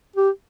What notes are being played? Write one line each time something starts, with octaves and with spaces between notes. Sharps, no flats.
G4